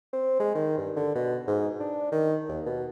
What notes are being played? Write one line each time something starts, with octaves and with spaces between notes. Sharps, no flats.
C4
G#3
D#3
G2
D3
B2
G#2
D4
D#3
D#2
B2